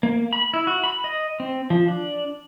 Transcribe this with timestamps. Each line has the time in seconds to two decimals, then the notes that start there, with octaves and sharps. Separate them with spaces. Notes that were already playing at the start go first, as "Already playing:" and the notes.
0.03 A#3
0.33 B5
0.54 E4
0.67 F#4
0.84 B5
1.04 D#5
1.40 C4
1.70 F3
1.88 D4